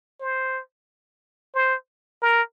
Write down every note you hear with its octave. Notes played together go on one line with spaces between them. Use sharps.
C5
C5
A#4